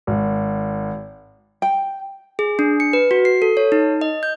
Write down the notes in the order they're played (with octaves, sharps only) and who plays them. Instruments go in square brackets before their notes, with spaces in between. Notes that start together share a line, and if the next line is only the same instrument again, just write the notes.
[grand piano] G#1
[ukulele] G5
[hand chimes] G#4
D4
C#7
B4
F#4
C7
A4
C#5
D#4
D#5
G6